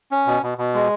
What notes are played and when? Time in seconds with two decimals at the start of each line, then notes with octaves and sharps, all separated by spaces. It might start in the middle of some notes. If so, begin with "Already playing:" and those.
0.12 C#4
0.26 B2
0.42 B2
0.58 B2
0.74 G#3